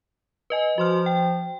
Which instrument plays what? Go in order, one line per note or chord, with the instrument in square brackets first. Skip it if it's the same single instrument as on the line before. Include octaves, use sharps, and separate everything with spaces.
[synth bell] B4 D#5 G#5
[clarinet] F3 [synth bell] F#4 C6 F6
[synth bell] G5